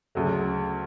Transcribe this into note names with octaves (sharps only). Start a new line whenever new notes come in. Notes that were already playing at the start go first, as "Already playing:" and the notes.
D2 C#3 F#3 A3